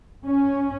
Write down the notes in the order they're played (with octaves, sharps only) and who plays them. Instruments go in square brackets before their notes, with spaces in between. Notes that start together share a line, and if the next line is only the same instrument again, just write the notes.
[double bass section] C#4